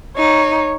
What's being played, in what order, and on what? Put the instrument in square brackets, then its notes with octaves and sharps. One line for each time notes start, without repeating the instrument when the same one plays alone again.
[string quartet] D#4 [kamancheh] C#5